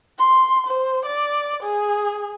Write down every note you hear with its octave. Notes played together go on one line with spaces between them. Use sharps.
C6
C5
D5
G#4